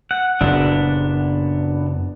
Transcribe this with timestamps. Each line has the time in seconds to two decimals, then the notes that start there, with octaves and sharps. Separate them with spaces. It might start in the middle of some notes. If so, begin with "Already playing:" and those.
0.11 F#5
0.41 F#1 F#2 A#2 B3 D4